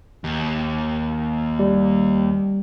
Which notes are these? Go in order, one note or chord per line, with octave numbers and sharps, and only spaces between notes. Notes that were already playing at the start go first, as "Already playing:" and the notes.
D#2
G3